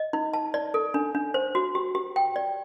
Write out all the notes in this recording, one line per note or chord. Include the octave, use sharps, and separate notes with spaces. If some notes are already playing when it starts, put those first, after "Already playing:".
Already playing: D#5
D#4
A5
D5
A4
D4
D4
C5
F#4
G4
G4
G5
D5